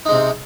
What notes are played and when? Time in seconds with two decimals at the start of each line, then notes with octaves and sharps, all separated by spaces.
0.05 D#4
0.09 G#3
0.12 C3
0.15 C4